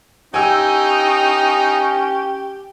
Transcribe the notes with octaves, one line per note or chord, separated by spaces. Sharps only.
C#4 D#4 G4 G#5 E6